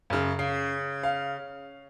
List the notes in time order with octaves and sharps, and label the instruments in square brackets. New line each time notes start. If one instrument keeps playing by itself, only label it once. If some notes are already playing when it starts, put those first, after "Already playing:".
[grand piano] F#2 C#3
[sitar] C#3 [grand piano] C7
[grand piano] F5